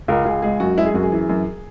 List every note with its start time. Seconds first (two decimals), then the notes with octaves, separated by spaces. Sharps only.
0.08 C#2 A#4
0.25 C#2 G#4
0.42 G#3 G#4
0.60 F#2 F#4
0.78 G#3 E4
0.86 G#4
0.94 F#2 F#4
1.03 G#4
1.12 E3
1.29 F#2